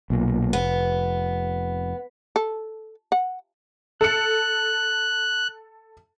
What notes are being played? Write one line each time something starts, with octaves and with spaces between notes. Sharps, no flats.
B1 A#2
F1 B3
A4
F#5
A4 F#6 C#7